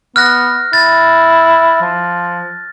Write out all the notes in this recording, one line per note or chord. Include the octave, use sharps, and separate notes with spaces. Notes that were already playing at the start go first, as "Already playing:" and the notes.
B3 F6 F#6 A#6
E4 A6
F3